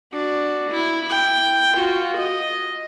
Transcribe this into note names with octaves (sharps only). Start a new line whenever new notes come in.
D4 F#4
E4
E4 G5
F4 F#4
D#5